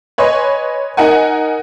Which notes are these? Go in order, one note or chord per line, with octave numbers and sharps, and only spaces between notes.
B4 C#5 D#5 G#5 C6
D#4 A#4 F#5 G#5